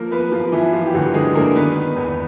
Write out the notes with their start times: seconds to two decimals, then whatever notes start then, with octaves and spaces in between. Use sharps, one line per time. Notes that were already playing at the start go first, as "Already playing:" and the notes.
Already playing: F3 A#3 A#4
0.11 A#3 B3 B4
0.32 F3 F4
0.52 E3 F3 E4
0.73 F3 F4
0.86 G4
0.93 D2 F#3 F#4
1.14 D3 G#3 G#4
1.34 D3 A#3 A#4
1.56 D#3 B3 B4
1.75 D#3
1.96 E2